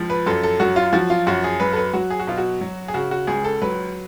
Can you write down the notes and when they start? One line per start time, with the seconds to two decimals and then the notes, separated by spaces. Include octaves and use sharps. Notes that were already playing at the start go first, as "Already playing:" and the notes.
Already playing: C#2 F3
0.10 B4
0.26 F#2 A4
0.43 A4
0.60 F#3 F#4
0.76 F4
0.93 F3 F#4
1.10 F4
1.27 F#2 F#4
1.44 G#4
1.60 F#3 B4
1.73 A4
1.76 B4
1.93 F#3 F#4
2.10 G#4
2.20 F#4
2.27 B2 F4
2.38 F#4
2.61 F#3
2.88 G#4
2.94 C#3 F#4
3.11 F#4
3.27 C#2 G#4
3.44 A4
3.62 F#3 B4